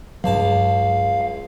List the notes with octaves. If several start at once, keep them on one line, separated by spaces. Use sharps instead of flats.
C#2 G2 F#3 F5 A5